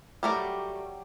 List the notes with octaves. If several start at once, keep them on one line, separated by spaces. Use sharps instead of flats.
F#3 G3 A3 G4 A#4 D5